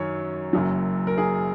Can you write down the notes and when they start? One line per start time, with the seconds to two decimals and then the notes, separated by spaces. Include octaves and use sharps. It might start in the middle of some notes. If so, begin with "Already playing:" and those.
Already playing: F#2 D#3 F#3 C#5
0.53 F#1 F#2 F#3
1.07 A#4
1.18 G#4